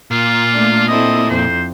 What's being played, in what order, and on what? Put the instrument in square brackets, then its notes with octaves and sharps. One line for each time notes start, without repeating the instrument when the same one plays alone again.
[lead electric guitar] A#2 [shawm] F4
[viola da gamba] A3 D4
[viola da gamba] C4 E4 A4 [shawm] D#5
[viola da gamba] F2 [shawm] C5